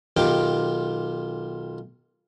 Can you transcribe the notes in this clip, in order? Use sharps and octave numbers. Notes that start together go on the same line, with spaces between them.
B1 D#3 F4 G4 D6